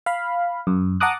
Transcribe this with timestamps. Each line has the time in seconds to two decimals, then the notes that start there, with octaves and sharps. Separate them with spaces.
0.06 F5 B5
0.67 F#2
1.00 F#5 A5 A#5 D6 D#6 F#6